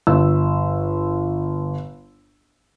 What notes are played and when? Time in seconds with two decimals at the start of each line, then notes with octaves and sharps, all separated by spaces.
0.07 G1 E6